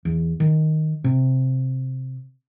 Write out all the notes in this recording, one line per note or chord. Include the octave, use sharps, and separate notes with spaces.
E2
D#3
C3